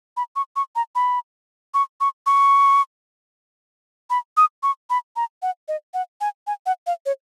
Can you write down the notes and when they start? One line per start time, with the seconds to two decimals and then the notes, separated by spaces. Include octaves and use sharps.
0.17 B5
0.36 C#6
0.56 C#6
0.76 A#5
0.95 B5
1.74 C#6
2.01 C#6
2.26 C#6
4.10 B5
4.37 D#6
4.63 C#6
4.90 B5
5.16 A#5
5.42 F#5
5.68 D#5
5.94 F#5
6.21 G#5
6.47 G#5
6.66 F#5
6.87 F5
7.06 C#5